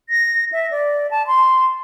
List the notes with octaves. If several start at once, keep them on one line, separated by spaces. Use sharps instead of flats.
A#6
E5
D5
A5
C6